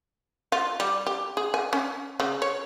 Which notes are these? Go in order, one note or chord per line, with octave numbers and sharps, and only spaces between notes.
F4
G3
G4
G#4
G#5
C#4
C#3
C#5